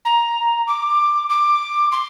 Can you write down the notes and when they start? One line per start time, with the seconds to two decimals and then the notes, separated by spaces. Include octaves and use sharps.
0.05 A#5
0.67 D6
1.29 D6
1.92 C6